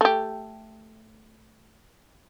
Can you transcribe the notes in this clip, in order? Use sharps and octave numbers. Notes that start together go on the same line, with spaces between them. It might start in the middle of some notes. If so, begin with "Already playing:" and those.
A3 G4